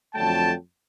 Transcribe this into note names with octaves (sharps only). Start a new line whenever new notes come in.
F2 D3 F#3 A3 G5 A5